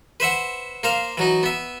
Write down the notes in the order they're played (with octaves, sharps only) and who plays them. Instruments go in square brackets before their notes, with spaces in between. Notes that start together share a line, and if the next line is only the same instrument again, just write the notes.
[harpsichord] B4 C5 E5 F#5
A#3 C5 F5
E3 F#3 D#4
B3 E5